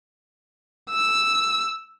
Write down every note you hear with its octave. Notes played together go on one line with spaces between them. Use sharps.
E6